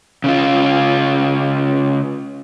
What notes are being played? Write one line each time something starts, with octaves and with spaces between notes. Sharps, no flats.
C#3 C#4 F4